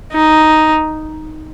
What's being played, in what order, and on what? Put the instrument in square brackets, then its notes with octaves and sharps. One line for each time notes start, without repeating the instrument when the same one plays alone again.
[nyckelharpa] D#4